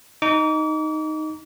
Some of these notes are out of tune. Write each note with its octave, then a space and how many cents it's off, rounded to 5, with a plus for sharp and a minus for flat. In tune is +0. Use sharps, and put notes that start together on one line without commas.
D#4 +0 D6 -40